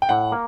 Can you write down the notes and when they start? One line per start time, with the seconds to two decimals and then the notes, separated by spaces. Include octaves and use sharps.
0.02 G5
0.09 A2 F#5
0.32 A#3